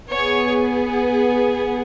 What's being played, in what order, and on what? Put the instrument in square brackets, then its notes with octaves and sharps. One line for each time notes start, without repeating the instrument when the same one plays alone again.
[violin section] B3 G#4 C#5